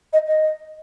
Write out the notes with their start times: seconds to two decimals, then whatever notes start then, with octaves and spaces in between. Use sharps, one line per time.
0.13 D#5
0.27 D#5